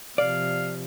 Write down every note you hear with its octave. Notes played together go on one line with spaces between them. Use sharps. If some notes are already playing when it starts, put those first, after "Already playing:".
C3 F3 D5 F5